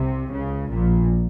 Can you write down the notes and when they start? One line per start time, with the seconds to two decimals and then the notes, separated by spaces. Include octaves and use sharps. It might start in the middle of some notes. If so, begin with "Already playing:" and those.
Already playing: C2 C3
0.32 C#2 C#3
0.70 A#1 A#2